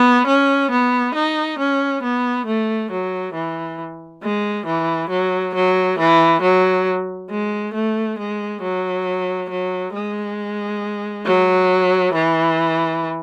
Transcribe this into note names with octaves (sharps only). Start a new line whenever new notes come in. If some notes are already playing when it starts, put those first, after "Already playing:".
Already playing: B3
C#4
B3
D#4
C#4
B3
A3
F#3
E3
G#3
E3
F#3
F#3
E3
F#3
G#3
A3
G#3
F#3
F#3
G#3
F#3
E3